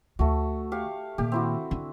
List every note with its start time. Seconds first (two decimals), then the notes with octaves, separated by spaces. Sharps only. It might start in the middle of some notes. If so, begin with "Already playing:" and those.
0.19 D2 A3 F#4
0.72 G4 F5 C#6
1.18 A#2 D#3 G4
1.32 C4 E4 F#4
1.71 D3